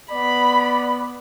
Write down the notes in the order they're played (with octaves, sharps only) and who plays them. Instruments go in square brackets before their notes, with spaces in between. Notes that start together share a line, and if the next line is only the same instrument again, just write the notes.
[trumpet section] B3 D5 [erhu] B5